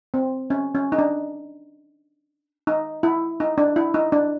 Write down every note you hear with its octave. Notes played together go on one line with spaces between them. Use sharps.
C4
C#4
C#4
D#4
D4
D#4
E4
D#4
D4
E4
D#4
D4